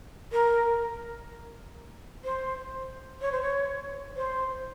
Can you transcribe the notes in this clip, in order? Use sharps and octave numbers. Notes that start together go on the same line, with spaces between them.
A#4
C5
C#5
C5
C#5
C5